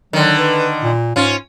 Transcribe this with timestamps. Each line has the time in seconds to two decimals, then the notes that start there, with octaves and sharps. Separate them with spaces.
0.13 D3 D#3 F#3
0.38 B4
0.83 A#2
1.16 G#2 C#4 F4